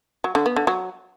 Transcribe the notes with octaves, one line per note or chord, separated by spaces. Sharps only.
F#3
D3
B3
D3
F#3